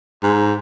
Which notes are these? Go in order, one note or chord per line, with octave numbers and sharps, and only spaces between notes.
G#2